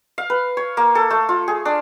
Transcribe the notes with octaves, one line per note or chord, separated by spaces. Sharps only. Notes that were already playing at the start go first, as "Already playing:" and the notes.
F5
B4
C#5
A#3
A4
A3
F4
G#4
D4